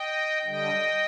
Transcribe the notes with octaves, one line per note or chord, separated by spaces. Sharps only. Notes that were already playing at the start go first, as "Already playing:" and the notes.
Already playing: D#5 G5
D3 G3 D#5 G5